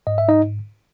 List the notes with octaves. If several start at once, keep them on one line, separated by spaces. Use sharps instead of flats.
G#2 D#5
E5
D#4 D#5